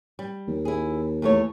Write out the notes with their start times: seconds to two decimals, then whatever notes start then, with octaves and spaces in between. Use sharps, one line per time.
0.19 G3
0.48 D#2
0.65 E4 G#4
1.22 E2 A3 C#5